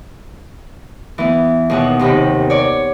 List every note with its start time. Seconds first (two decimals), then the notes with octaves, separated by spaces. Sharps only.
1.18 E3 B3
1.70 D#2 B2 F#5
1.99 D#2 C3 D#3 B5
2.50 C#5 D5